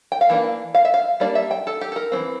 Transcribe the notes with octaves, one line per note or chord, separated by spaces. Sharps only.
G5
F5
E3 A#3 D4
F5
E5
F5
G3 A#3 D4 D5
E5
G5
A4
G4
A4
A#4
E3 A3 C4